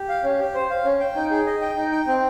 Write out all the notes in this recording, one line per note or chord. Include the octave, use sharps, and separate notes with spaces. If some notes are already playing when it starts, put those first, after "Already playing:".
Already playing: G4
F5
C#4
G4
C5
F5
C#4
G5
D#4
G#4
D#5
G5
D#4
G5
C4